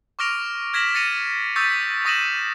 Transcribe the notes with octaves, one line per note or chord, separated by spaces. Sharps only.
C#6 D6 F6 A#6 D7 F7
F6 G#6 A#6 B6 E7 F#7
A6 A#6 C#7 D#7 F7
C#6 D#6 E6 G6 A6 B6
C#6 D#6 A#6 D#7 E7 F#7